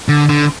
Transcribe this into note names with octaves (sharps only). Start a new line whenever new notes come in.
D3
D3